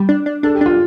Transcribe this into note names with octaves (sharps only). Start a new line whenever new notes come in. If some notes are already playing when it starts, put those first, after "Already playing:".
Already playing: G3
D4
D4
D4 A4
G4
D4 F4